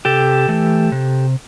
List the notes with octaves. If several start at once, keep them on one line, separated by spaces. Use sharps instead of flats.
C3 G4 A4
E3 A3
C3